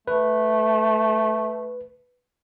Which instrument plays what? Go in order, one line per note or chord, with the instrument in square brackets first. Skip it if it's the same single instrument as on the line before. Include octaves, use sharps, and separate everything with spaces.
[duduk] A3 [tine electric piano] B4